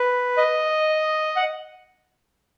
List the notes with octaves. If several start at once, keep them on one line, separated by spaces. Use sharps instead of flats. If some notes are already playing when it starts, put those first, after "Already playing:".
Already playing: B4
D#5
F#5